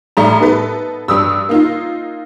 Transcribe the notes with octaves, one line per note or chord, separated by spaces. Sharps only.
A2 G3 A#5
B3 D#4 A4 B4
G2 G3 D#6 E6
A#3 D#4 F4